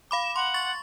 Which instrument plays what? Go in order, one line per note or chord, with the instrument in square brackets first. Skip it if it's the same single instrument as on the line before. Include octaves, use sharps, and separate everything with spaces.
[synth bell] F5 B5 D6
[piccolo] E7
[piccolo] F#5 [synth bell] C6
[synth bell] C#6 A6